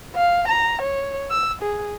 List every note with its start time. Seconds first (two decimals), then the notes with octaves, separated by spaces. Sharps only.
0.15 F5
0.47 A#5
0.81 C#5
1.30 E6
1.62 G#4